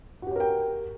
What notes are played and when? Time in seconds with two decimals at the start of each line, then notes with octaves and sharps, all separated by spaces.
0.22 F#4
0.27 G4
0.31 C#5
0.36 A#4
0.40 G5